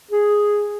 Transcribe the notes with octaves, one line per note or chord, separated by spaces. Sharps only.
G#4